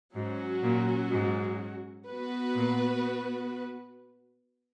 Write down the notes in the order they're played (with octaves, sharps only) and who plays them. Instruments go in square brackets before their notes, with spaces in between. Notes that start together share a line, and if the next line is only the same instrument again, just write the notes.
[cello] G#2 [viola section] F#3 C#4 F#4
[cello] A#2
G#2
[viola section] B3 F#4 B4
[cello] A#2